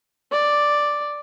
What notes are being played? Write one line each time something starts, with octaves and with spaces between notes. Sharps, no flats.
D5